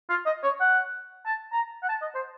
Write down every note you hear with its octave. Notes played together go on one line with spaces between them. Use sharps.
F4
D#5
C#5
F#5
A5
A#5
F#5
A5
D#5
C5